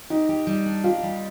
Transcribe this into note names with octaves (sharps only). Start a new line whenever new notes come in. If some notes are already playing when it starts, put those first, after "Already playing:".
D#4 G4
G4
G3
D4
F4 G4
G3